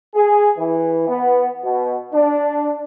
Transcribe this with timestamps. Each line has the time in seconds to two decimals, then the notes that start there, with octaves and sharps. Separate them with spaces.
0.15 G#4
0.58 E3
1.08 B3
1.63 B2
2.13 D4